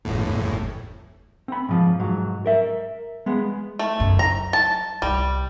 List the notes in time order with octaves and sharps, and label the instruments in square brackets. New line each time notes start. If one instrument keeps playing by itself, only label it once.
[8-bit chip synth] G1 E2 A2
[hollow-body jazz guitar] C4 B5
G#2 F3
G#2 F#3
A#4 E5
G#3 B3
[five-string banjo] A3
[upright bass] F#2 C#3
[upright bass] F#3 [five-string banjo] A#5
[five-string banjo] A5
[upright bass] C2 [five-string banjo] G3